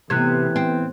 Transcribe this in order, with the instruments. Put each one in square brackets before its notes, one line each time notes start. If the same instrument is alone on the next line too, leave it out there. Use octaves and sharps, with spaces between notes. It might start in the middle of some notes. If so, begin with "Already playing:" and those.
[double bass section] A2 B3 [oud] C3 [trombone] E3 [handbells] F#6 G#6
[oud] C4